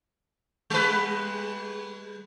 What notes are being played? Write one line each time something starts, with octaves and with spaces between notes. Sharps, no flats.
G3 G#3 B4